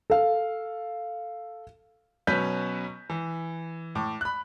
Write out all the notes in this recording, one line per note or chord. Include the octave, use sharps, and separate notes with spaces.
A4 F5
B2 F#3 C#4 B4 G6 B6
E3
A2 D6
B5 F#6